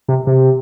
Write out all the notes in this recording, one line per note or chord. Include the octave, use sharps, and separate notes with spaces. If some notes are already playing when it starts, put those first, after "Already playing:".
C3
C3